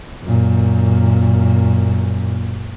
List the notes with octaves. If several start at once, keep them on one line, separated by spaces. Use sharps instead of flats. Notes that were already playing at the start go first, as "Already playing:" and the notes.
F#2 A#2